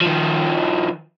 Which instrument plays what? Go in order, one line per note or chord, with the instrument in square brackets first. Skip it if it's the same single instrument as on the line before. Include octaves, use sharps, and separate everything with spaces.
[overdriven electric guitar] D#3 F3